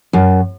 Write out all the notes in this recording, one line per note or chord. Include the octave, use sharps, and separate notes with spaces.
F#2